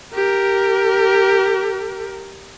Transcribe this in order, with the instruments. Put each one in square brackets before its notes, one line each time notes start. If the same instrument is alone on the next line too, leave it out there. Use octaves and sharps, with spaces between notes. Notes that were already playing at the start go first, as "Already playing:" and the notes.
[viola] G4 A#4